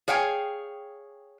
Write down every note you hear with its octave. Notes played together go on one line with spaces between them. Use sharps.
G#4 C#5 F5 G5 G#5